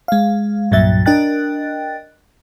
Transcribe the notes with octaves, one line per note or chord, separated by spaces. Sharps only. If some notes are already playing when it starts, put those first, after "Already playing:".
G#3 F5
C2 G2 A#2 F#3 E5 A6
D4 A#4 D#5 G5 F#6 A6